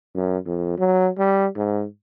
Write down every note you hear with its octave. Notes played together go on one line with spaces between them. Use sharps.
F#2
F2
F#3
G3
G#2